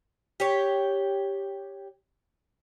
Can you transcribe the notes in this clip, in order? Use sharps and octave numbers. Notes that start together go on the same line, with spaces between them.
G4 C#5